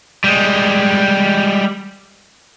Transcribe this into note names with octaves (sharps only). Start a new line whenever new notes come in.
G3 G#3